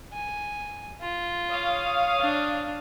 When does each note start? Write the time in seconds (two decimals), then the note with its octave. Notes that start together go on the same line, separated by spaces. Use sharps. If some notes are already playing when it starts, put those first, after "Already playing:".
0.13 G#5
1.01 F4
1.50 C#5 F5 D#6
2.20 D4